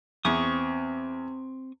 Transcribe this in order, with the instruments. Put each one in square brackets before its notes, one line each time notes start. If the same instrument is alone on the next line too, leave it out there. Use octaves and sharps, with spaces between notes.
[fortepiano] E2 [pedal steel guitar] C4 C#6 D#6